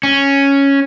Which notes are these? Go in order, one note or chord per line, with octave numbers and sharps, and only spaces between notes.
C#4